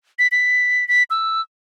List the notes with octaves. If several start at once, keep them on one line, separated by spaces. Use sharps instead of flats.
B6
B6
B6
E6